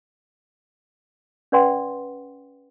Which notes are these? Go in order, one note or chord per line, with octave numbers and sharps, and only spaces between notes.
C#4 B4 D5 F#5 G5 C6